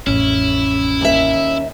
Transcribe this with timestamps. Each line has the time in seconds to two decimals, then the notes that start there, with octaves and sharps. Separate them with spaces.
0.07 A1 F2 C#4 E4
1.01 D#2 E5